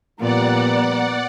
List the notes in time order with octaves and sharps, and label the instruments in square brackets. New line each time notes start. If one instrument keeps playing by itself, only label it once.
[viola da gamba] A#2 [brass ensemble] F3 G3 A#5 [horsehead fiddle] B3 [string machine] D5 F#5